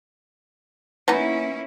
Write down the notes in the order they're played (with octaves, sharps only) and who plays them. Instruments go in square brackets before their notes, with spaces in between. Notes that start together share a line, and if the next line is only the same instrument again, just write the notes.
[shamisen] E3 B3 D#4 [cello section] A#3 C#4 E4